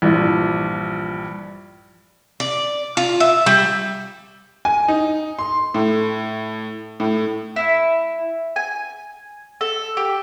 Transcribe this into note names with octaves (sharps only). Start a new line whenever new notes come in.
A#1 G2 E3 F3
D5
F4
E5
G3
G#5
D#4
C6
A2
A2
E4
G#5
A4
G4